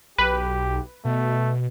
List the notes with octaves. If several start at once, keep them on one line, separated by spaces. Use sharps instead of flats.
B1 G4 B4
B2 A3